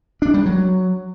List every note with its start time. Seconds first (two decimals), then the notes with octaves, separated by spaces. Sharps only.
0.22 D4
0.34 G3
0.46 F#3